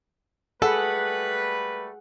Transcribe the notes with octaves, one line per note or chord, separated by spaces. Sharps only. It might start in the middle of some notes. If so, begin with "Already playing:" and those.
G3 A3 G#4 A4 B4 F#5